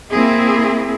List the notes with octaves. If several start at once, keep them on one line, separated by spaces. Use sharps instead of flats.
A#3 C4 E4 G#4